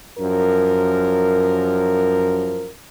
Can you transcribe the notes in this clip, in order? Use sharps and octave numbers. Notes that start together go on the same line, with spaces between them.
F#2 F3 A#4